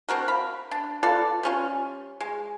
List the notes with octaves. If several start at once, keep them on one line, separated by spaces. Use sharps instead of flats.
C4 D4 F#4 A#4
F5 B5
D4
F4 A4 B4 D5
G3 C#4 F4
G#3